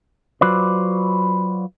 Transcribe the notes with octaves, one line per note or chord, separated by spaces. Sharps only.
F#3 F4 B4 C5 D5